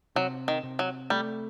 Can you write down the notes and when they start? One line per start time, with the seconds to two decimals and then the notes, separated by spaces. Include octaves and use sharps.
0.16 C3 F#3
0.48 D#3
0.63 C3
0.79 F#3
1.10 G3 A3